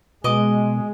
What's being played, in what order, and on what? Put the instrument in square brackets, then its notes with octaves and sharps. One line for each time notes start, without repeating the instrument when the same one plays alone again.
[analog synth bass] B2 [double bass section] G#3 [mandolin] D#5 D6